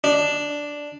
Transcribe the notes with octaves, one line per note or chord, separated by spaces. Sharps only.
D4